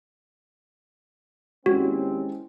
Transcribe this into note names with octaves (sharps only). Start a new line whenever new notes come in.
D#2 G3 G#3 C4 C#4 E4 F#4